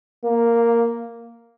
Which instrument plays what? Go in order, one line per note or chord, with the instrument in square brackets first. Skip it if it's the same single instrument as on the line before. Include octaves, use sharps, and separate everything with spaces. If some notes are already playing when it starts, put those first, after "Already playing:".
[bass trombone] A#3